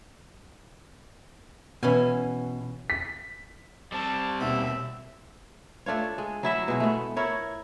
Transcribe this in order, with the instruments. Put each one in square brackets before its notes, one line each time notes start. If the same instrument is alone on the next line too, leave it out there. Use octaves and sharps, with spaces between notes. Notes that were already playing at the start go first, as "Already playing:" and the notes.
[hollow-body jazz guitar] B2 [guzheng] E3 C#4 G#5
[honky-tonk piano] B6
[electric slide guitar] G3 C4 [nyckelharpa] A5
[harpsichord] D#2 B2 [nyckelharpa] E5
[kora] A3 D4 F4 C#5
G#3
F#3 E4 E5
B2 G#3
A3 B3
E4 A#4 C#5